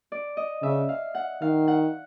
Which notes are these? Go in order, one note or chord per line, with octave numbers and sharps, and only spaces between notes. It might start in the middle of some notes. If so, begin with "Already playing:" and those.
D5
D#5
C#3 E5
F5
F#5
D#3 F5
F#5